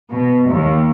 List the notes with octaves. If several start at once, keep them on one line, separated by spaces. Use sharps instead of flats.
B2
D#2